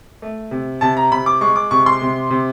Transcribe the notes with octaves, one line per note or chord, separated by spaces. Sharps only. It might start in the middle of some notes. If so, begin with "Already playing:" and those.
A3
C3
C3 A5
A#5
C3 B5
D6
G#3 C#6
D6
C3 C#6
C6
C3
C3